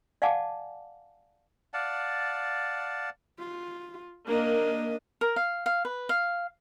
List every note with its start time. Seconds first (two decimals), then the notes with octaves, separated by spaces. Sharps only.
0.22 D5 F5 F#5 G#5 A5 D6
1.74 D5 F5 F#5 A5
3.39 F4
4.27 A#3 D4 D#5
5.21 A#4
5.36 F5
5.66 F5
5.85 B4
6.09 F5